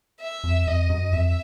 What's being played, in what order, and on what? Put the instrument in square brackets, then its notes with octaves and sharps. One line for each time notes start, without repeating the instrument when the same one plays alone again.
[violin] E5
[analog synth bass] F2
[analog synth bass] F2 [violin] D#5
[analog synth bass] F#2
[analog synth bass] F2 [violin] E5